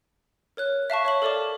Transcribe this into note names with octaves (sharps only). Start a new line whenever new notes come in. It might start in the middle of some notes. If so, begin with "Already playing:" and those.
A#4 C#5 F#6
E5 F5 A5 C#6
C#5 E5 F#7
A4 A#4 D5 A5 D6